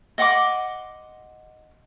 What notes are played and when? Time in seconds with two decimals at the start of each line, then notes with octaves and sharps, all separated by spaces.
0.18 D#5 F#5 C6 D6